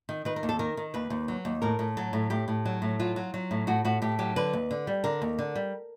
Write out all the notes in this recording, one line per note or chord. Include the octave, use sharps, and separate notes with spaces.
D#3
D#3 B4
A#4
D#2
A4
D#3 A#4
D#3
D#2 B4
D#2
F#3
D#2
A2 A#4
A2
F#3 A4
A2
A2 G4
A2
F#3
A2
F#3 F4
F#3
F#3
A2
A2 F#4
A2 F#4
A2 G4
F#3 G4
D3 B4
D#2
D3
G3
D3 A#4
D#2
D3
G3